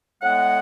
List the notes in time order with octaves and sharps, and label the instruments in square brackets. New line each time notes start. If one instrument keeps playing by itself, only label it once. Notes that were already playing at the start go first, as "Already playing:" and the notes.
[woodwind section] A2 G#3 B3 F#5